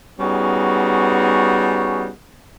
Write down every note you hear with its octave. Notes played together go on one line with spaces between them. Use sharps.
G3 B3 C#4 D#4 F#4 G#4